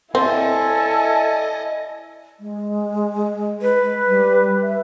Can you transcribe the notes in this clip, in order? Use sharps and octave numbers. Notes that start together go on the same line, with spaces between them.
C4 E4 A4 D#5 E5 G#5
G#3
B4
G3
E5